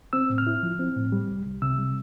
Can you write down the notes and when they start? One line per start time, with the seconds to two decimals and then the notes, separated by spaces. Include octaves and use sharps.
0.13 C4 E6
0.30 A2
0.38 F6
0.47 E4
0.63 F3
0.79 C4
0.96 A2
1.12 G3
1.29 C2
1.46 C2
1.62 C3 E6
1.78 G3